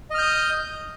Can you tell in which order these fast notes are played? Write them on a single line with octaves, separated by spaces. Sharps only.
D#5 F6 G6 D#6